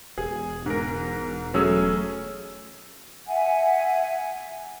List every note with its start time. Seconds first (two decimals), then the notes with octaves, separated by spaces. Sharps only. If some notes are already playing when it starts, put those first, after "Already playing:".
0.18 E1 G#4
0.66 G#2 A#4
1.54 F#3 A3 C#4 G#4 E6
3.28 E5 F#5 G#5